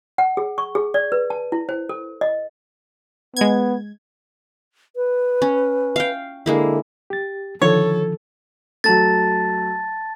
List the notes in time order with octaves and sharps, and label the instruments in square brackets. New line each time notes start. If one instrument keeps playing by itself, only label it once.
[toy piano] F#5
G#4
C#6
G#4
D5
B4
A5
E4
C5
A4
D#5
[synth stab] G#3 G#6 [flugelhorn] B3
[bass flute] B4
[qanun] C#4
F5 G5
[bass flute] D3 [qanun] G#3 A#3 E4
[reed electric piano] G4 A6
[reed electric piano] D3 D#3 F3 [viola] A4 [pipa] C#5
[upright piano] F#3 A3 [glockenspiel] A5 A6